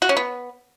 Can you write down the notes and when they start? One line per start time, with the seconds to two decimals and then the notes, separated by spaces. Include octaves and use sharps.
0.02 F#4
0.09 C#4
0.17 B3